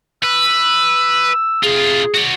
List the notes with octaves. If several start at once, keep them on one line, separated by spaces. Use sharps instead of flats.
B4 E6
C3 F4 G#4
F#4 D5